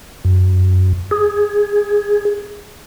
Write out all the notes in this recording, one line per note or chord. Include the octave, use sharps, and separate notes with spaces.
F#2
G#4